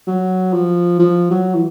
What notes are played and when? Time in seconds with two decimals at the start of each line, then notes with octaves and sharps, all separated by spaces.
0.07 F#3
0.53 F3
0.99 F3
1.31 F#3
1.54 E3